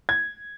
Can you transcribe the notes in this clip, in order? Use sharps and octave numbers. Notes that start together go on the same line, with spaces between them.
G#6